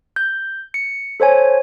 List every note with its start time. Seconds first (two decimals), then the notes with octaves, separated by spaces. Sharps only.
0.16 G6
0.74 C#7
1.20 A4 C5 C#5 G#5